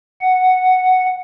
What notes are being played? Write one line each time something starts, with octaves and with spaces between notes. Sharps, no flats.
F#5